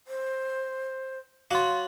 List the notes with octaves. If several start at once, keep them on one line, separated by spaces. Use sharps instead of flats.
C5
F#3 F#4 F5 C6